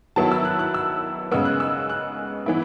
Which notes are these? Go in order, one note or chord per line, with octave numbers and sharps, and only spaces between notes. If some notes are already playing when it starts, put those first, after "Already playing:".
D#3 F#3 B3 E4 A5
E6
F#6
F#6
E6
C#3 G#3 B3 E6
F#6
E6
F#6
E3 B3 E4